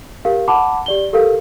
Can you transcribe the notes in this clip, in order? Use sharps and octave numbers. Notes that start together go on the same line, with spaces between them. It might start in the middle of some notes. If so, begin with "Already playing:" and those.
G4 A#4 F5
F#5 A5 B5 D6
G4 D5 G7
G4 A4 A#4 F5